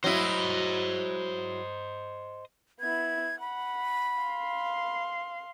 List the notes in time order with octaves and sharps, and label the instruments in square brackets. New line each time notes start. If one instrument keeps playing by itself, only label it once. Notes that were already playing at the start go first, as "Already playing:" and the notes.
[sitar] F#3 E4 [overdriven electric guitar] C5 D#5
[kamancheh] B3 E4 [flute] G#6
[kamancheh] F#5 [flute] B5
[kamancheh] F5 C6